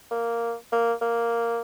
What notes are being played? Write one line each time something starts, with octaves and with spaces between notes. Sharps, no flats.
A#3
A#3
A#3